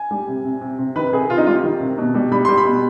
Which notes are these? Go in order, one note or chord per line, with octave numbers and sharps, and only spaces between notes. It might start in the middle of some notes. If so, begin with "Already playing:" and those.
Already playing: G#5
G3
C3
C3
C3
C3
D#3 B4
C3 G#4
C3 F4
D#4
G3 F4
D#3
C3
B2
G3
G3 B5
G3 C6
B5
B2